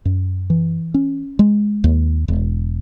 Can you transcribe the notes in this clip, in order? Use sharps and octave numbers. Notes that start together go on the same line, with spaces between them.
F#2
E3
C#4
G#3
D#2
E1